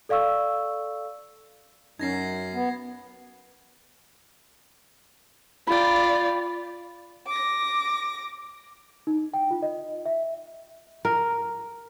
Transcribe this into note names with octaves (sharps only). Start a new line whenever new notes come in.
A4 D5 F5 C#6 E6
F#2 C#4 D#4 G#6 A#6 C7
B3
F4 D5 G5 B5
D6 A#6
D#4
G5
F4
D#5
E5
A#4